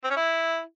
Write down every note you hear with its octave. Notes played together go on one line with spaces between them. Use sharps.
C4
C#4
E4